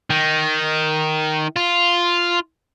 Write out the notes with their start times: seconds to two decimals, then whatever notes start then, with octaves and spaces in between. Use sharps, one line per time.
0.10 D#3
1.56 F4